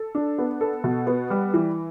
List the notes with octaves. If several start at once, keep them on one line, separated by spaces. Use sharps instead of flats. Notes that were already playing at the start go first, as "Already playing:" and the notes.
Already playing: A4
D4
B3
A4
B2
B3
G3
E3